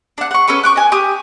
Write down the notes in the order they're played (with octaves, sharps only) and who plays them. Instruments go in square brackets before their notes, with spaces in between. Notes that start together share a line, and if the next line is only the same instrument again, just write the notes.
[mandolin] D4 F#5
F#5 C#6
C#4 A4 B4 C#6
C#6 D6 F#6
D#5 G#5
G4 D#6